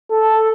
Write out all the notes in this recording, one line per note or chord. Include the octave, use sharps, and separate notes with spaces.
A4